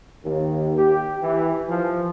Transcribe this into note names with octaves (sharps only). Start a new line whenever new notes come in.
D#2
G4
E3
F3